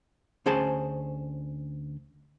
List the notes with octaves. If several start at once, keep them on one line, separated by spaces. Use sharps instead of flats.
D2 C#4 G#4 C5 A5